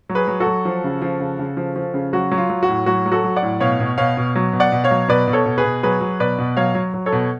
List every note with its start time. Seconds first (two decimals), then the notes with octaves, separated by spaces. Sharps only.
0.09 F#3
0.15 G#4 B4
0.28 F#3
0.40 F#4 A4
0.46 F#3
0.65 F3
0.84 C#3
1.02 F3
1.20 C#3
1.39 C#3
1.57 F3
1.76 F3
1.94 C#3
2.13 F#3 F#4
2.31 F#3
2.38 F4
2.50 F#3
2.63 F#4
2.68 A2
2.86 F#3 F#4
3.06 F#3
3.12 F#4 A4
3.24 F#3
3.36 D5 F#5
3.42 A2
3.60 B2 C#5 F5
3.80 B2
3.98 B2 C#5 F5
4.17 B2
4.35 F#3
4.53 B2
4.60 D5 F#5
4.72 B2
4.84 C#5 F5
4.91 F#3
5.08 B2 B4 D5
5.27 B2
5.33 A4 C#5
5.46 B2
5.58 G#4 B4
5.64 B2
5.83 F#3 G#4 B4
6.01 F#3
6.20 B2 B4 D5
6.39 B2
6.57 F#3 C#5 F5
6.75 F#3
6.94 F#3
7.06 A4 C#5
7.12 B2